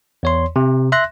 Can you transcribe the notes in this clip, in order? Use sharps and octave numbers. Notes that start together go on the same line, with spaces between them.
E2 C#5 C6
C3
E5 C6 F#6 A#6